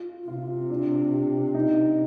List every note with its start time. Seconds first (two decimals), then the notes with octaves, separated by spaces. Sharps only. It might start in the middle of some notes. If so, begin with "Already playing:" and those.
Already playing: F4
0.27 C3 F4
0.70 D4
1.12 G4
1.54 D#4